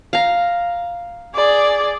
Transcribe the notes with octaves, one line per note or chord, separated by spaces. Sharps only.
F5 A#5
G#4 D5